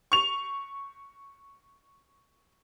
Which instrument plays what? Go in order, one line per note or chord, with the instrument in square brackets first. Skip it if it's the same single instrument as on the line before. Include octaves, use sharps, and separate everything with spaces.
[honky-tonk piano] C#6 F7